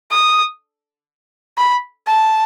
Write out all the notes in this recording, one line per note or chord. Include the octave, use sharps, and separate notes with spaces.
D#6
B5
A5